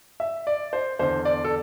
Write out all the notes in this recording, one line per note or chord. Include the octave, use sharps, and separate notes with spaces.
E5
D5
C5
E2 D3 C5
D5
A4